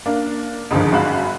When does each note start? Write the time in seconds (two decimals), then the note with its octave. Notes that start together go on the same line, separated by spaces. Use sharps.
0.06 A#3 D4
0.71 C#2 G#2 D3 D#3 F3
0.92 G1 F#2 F#4 F5 B5 F#6